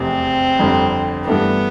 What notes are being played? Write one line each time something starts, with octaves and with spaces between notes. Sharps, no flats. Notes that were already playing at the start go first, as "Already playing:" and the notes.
Already playing: F1 E2 C3 C4
G1 F2 D3 G3
G2 E3 A3 B3 D4